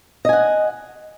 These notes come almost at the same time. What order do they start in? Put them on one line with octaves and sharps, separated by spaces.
D#5 G#5 F#5